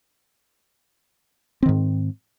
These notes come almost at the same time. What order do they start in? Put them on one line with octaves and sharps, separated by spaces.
C4 D#3 G#2